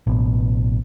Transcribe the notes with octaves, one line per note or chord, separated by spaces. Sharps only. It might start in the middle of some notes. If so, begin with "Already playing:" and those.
A1 B2